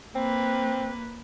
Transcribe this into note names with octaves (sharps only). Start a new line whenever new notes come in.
A#3 C4 B4